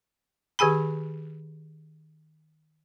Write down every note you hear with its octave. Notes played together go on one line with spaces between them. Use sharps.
D#3 G4 G#4 G#5 B5